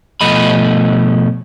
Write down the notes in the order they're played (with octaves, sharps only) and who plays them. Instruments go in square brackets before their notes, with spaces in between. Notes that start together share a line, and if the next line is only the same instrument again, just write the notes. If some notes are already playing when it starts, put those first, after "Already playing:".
[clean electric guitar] B2 F3 A3 D#5 B5